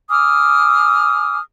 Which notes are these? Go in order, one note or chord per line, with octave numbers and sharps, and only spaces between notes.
G#5 D6 D#6 F6